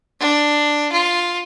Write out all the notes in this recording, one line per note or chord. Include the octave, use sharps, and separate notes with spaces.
D4
F4